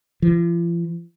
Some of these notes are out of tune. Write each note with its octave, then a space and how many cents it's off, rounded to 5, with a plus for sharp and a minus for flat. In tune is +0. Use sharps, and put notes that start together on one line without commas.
F3 -45